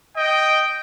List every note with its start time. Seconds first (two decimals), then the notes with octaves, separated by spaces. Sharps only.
0.16 D#5 G5